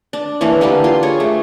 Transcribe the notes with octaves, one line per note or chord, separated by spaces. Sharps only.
D4
E3 A#3 C#4 D4
D3 A#3 G4 B4
F4 C6
G#4 C#5
A3